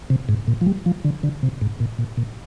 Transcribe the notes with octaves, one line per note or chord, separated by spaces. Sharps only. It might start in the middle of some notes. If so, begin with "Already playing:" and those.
C3
G#2
A#2
F3
G3
F3
D3
D3
C3
G#2
A#2
A#2
A#2